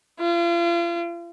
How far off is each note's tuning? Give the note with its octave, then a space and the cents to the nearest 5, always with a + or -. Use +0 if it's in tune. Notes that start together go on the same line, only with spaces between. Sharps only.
F4 -40